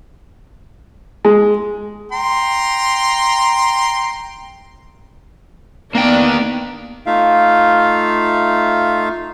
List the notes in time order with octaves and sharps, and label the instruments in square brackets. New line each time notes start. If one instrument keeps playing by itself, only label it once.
[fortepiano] G#3
[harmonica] G5 A#5 C6
[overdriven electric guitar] A#3 G5 [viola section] B3 D4
[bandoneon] A3 D#4 F4 E5 F5